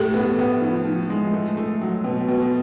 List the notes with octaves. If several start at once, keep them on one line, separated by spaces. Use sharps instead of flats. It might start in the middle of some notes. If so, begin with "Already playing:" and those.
Already playing: A2 G4 A4
B3
B3
F3
F3
G#3
A3
A3
F#3
B2
B2